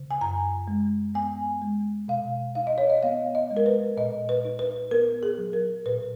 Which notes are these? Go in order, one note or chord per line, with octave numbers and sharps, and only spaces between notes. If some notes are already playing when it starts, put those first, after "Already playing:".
Already playing: C#3
G#5
F#2 A#5
G#3
B3 G#5
G#3
B2 F5
D#4 F5
D#5
C#5
D#5
B3 F5
D#5
G#3
A#4
B4
A#2 D#5
B4
D#4
B4
B3 A#4
G#4
F#3
A#4
A#2 B4